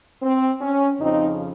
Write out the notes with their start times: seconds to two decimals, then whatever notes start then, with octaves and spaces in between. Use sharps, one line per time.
0.22 C4
0.61 C#4
0.99 F2 C#3 F3 C4 D#4